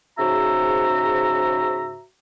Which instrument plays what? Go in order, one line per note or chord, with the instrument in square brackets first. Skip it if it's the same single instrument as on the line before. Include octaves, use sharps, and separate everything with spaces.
[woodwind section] G#2 C#3 F#4 C5 E5 A#5